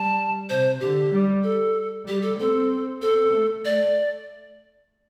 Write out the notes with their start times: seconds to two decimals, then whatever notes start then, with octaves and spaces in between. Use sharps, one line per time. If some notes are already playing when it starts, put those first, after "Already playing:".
Already playing: G3 A5
0.49 C3 C5
0.80 D3 G4
1.12 G3
1.43 A4
2.07 G3 G4
2.22 A4
2.39 C4 A4
3.02 C4 A4
3.33 A3
3.64 A3 D5